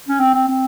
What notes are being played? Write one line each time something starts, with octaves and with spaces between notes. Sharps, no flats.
C#4
C4
C4
C4